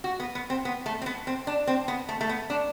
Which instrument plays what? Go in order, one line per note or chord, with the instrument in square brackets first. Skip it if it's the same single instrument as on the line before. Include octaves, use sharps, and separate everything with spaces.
[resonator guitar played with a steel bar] F#4
B3
B3
C4
B3
A3
C4
B3
C4
D4
C4
B3
A3
A3
B3
D4